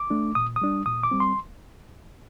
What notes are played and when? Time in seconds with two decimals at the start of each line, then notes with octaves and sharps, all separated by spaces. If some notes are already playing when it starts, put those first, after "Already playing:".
Already playing: D6
0.10 A3 D4
0.35 A#2 D#6
0.56 D#6
0.62 G3 D4
0.86 A#2 D#6
1.03 D6
1.11 G3 C4
1.20 C6